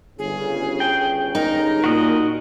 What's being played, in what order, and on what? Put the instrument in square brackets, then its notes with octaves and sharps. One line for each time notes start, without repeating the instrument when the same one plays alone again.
[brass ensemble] G1 C#3 [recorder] G#4
[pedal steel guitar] G5
[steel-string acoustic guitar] D#4 [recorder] A#4
[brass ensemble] A#2 [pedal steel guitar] F#4 D#5